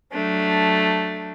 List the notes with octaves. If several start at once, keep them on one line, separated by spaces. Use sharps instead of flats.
F#3 A3 D4